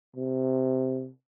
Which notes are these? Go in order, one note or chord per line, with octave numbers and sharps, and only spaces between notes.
C3